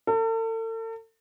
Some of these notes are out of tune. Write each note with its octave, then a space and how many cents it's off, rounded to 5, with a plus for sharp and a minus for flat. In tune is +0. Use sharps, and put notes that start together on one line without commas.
A4 +40